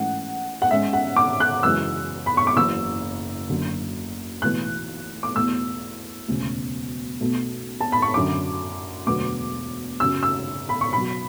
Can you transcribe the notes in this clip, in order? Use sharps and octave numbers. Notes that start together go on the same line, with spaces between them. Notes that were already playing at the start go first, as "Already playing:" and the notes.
Already playing: G#2 E3 A3 C#4 F#5
F#5
G#2 G#3 C#4 E5
F#5
D6
F#6
F#2 C#3 E3 G#3 E6
B5
C#6
D6
F#1 F#2 E3 E6
F#1 F#2 D3 F#3
B1 A2 E3 F#6
D6
E2 B2 A3 E6
E1 D2 C#3
B1 B2 A3
A5
B5
C#6
F#2 D3 F#3 C#4 D6
E1 D2 D3 F#3 B3 D6
F#2 C#3 F#3 C#4 E6
E6
B5
C#6
B1 B2 F#3 B5